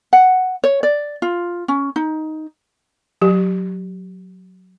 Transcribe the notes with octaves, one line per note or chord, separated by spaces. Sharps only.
F#5
C#5
D5
F4
C#4
D#4
F#3 G4